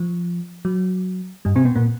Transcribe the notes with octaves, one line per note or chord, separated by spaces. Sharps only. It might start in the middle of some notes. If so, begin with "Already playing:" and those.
Already playing: F3
F#3
G2 G3
C3 C4
B2 B3
A#2 A#3